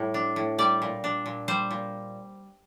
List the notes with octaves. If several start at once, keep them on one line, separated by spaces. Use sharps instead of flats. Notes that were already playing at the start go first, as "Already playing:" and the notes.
Already playing: A2 G3
D4
A2
G3 D5
A#2
D4
A#2
G3 C5
A#2